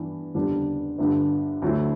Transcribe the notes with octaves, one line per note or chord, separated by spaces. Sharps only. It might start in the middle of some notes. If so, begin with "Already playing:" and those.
Already playing: G2 E3 B3 D4
F#1 E2 D3 G3 D4
G1 G2 D3
D2 D3 F#3 A3 E4